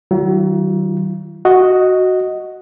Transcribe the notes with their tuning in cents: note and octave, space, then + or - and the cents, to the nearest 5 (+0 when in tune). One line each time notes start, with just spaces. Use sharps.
D#3 -5 F#3 +35 F4 -30
F#4 +0 D#5 +5